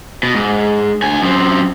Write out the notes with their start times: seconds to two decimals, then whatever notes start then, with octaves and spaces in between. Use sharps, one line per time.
0.23 B2
0.35 G#2
1.02 D2 G#5
1.22 F#2 C4